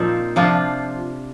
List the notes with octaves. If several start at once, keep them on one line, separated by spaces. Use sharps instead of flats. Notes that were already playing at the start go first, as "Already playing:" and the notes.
Already playing: A#2 F3 C4 D#4
C3 F3 D4 F4